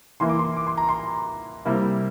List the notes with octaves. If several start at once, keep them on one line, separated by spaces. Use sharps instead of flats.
E3 A#3 E4 C6
D6
C6
D6
C6
A#5
C6
C3 G3 A#3 E4